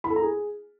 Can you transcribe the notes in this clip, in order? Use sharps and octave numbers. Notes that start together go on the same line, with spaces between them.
B5
A4
A#5
G#4